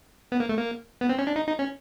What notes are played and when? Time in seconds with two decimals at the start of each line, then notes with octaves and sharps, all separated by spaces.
0.32 B3
0.40 A#3
0.49 A3
0.57 A#3
1.01 B3
1.09 C4
1.19 C#4
1.27 D4
1.36 D#4
1.47 D#4
1.59 C#4